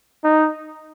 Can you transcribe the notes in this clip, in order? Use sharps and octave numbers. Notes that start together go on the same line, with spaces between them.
D#4